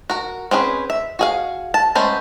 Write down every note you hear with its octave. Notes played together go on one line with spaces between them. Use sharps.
F#4 A#4
C4 C#4 G#4 B4
E5
F#4 G#4 F5
A5
G#3 A3 B3 C#4 C5